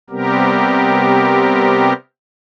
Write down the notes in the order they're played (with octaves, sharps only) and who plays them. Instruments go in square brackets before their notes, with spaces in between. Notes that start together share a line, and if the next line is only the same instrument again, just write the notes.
[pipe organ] C3 G3 B3 C4 G4 A#4